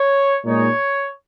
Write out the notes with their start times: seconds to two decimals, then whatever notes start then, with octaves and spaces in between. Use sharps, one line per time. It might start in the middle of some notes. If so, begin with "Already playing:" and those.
Already playing: C#5
0.44 A#2 G#3 D#4 C#5